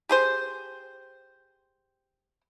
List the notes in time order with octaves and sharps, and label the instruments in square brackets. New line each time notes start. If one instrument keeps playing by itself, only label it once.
[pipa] G4 G#4 C5